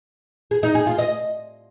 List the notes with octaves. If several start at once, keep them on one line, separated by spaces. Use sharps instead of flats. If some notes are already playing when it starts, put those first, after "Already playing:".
G#4
D#4
G#4
F4
D#5